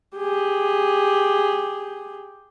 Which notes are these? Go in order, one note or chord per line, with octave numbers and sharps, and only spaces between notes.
G4 G#4